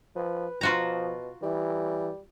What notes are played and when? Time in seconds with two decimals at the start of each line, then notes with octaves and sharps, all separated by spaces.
0.16 F3 B4
0.61 B2 F3 F4 F#4 A#5
1.43 E3 G3